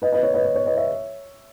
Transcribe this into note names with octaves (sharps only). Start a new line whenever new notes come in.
B4 D#5
B4 D#5
C#5
B4 D#5
C#5
C#5
B4 D#5
C#5 E5